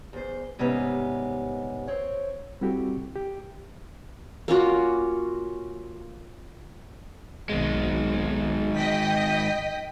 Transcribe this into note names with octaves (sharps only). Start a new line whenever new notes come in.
E2 C5
G#2 C3 G3 B3 C#4 D#4
C4 C#5
G3 C4 E4 F#4 G4 A4
G4
A#3 C#4 F4 F#4
B1 D#3 G#3
D#5 G5 B6